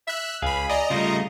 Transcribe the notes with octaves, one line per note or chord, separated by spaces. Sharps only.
E5 E6 F#6
C#2 G#4 F5 B5
D5 D#5 A#5
C#3 G3 A3 F4